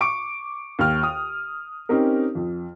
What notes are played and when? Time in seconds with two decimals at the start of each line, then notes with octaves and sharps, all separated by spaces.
0.01 C#6 D6 D7
0.79 D#2 F6
1.03 D#6
1.89 C4 C#4 D#4 G4 A#4
2.35 F2